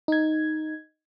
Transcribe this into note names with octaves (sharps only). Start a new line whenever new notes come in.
D#4 G#6